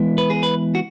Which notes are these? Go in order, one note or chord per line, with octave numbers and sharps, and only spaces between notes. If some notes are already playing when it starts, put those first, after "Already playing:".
Already playing: E3 G#3 B3 E4
B4
G#4
B4
F#4